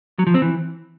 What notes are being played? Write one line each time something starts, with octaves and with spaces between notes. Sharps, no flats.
F#3
F3
C4
E3